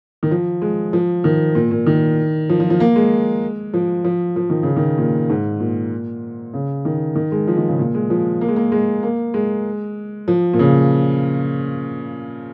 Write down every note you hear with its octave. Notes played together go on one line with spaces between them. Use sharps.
D#3
F3
G#3
F3
D#3
A#2
A#2
D#3
F3
F3
F3
A#3
G#3
F3
F3
F3
D#3
C#3
D#3
A#2
G#2
A#2
C#3
D#3
D#3
G#3
F3
D#3
C#3
A#2
G#3
F3
A#3
G#3
A#3
G#3
A#3
G#3
F3
A#2
C#3